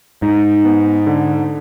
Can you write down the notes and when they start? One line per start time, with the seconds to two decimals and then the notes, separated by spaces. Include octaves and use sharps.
0.22 G#2 D#4
0.65 B3
1.07 D3